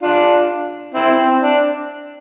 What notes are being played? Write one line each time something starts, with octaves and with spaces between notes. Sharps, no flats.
D4 F4
C4 E4
C4
D4